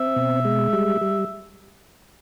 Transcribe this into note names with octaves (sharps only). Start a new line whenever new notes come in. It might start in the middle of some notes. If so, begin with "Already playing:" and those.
Already playing: C4 E5
B2
G#3
G3
G3